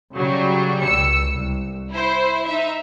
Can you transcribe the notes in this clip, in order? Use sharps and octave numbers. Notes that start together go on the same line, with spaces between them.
C#3 F#3 G3
C#2 E6 C#7
C2
E4 C5
D#4 E5